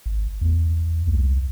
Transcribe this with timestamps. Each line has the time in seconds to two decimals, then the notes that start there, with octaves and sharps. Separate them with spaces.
0.06 G#1
0.41 E2
1.07 C2